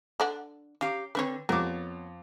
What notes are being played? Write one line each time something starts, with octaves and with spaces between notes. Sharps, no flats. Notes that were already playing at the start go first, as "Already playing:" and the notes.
D3 D4 F#5
C#4 G4 F5 A#5
D3 B3 C4 B4 C#5
F2 B3 A#4 C#5 D6